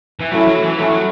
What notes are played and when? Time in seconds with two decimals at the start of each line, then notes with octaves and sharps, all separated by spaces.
0.20 E3
0.31 A2 F#3 A3 C#4 E4
0.47 F#3
0.63 E3
0.78 A2 F#3 A3 C#4 E4
0.90 F#3